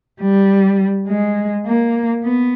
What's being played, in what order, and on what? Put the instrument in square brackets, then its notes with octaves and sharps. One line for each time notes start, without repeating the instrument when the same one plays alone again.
[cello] G3
G#3
A#3
B3